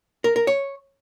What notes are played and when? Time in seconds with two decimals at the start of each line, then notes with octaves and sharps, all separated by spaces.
0.24 A#4
0.36 A#4
0.47 C#5